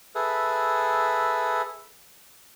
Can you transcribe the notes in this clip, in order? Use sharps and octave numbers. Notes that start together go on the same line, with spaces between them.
G#4 A4 B4 E5